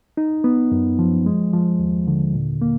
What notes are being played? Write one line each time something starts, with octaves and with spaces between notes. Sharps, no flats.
D#4
B3
F#2
F3
G#3
F3
D#2
D3
A#2
A#3